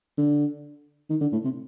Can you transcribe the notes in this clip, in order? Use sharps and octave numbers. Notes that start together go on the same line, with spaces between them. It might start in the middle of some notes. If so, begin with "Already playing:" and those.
D3
D#3
D3
A2
C3